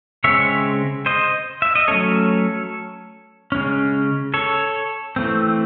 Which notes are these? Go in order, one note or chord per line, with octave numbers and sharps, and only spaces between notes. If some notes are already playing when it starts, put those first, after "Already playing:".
C#3 G#3 C4 C#5 E5
C5 D#5
E5
D#5
F#3 A3 C#4 A4 C#5
C#3 G#3 C#4
A4 C#5
E3 A3 C4